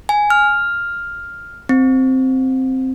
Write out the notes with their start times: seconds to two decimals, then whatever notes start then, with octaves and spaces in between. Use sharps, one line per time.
0.09 G#5
0.30 F6
1.69 C4